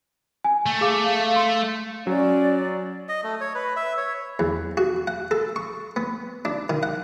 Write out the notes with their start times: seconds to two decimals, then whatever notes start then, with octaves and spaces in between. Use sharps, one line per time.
0.44 G#5
0.66 A3
0.81 G#4 F5 D6
1.19 F5
1.36 C6
2.07 F#3 C#4 D5
3.09 D#5
3.24 A3
3.41 C#5
3.55 B4
3.76 E5
3.97 C#5
4.39 E2
4.77 F#4
5.07 F#5
5.31 A4
5.56 C#6
5.96 B3
6.45 D4
6.70 D#3
6.83 F#5